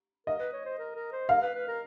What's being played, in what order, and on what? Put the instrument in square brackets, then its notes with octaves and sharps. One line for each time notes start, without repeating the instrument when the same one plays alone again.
[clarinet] A#4 [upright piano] D#5
[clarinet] B4
C#5
C5
A#4
A#4
C5
[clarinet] A#4 [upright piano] F5
[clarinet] B4
B4
A#4